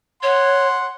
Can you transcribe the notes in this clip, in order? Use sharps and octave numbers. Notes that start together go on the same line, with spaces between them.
C#5 F#5 C6